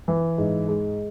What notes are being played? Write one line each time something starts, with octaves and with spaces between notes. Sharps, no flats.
E3
G#2
G#3